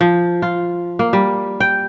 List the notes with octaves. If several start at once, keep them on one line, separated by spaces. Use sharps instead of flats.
F3
F4
A#3
G3
G5